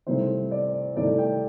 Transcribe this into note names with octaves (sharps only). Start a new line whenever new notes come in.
C2 C3 D#3 A3 C5
D5
C2 C3 D#3 A3 D5
G5